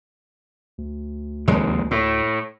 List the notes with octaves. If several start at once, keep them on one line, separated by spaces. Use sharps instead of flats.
D2
F1 D#2 G#3
A2